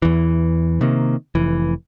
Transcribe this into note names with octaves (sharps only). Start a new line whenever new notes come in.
E2 E3
C3 D#3 A#3
F1 E3